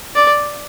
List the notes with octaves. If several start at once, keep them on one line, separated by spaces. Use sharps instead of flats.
D5